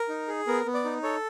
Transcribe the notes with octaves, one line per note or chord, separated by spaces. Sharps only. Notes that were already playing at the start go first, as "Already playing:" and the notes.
Already playing: A#4
D#4
G#4
B3 A#4
B3
D5
D#4
A4 C#5